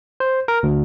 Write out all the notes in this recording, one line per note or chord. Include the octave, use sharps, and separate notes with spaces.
C5
A#4
D2